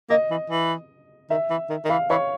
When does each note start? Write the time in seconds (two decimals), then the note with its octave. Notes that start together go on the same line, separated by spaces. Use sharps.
0.09 A#3 D#5
0.30 E3
0.50 E3
1.30 D#3 E5
1.50 E3
1.70 D#3
1.85 D#3
1.89 E3 F5
2.10 E3 C#5